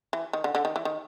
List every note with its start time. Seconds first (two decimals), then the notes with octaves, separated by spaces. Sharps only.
0.13 E3
0.33 D#3
0.44 D3
0.55 D3
0.65 D#3
0.76 E3
0.85 D#3